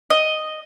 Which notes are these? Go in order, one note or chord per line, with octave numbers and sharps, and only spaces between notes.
D#5